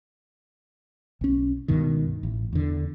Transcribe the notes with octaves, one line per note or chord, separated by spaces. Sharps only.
B1 C#4
C#2 G2 B2 D#3
A1
E2 D3